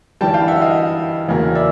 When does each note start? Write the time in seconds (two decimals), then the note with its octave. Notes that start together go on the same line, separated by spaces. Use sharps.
0.21 G2 E3 G3 G5 A5
0.34 F5 G5
0.48 E5 F#5
0.61 D#5 F5
1.28 E2 C#3 F#3 A#3
1.55 D5 E5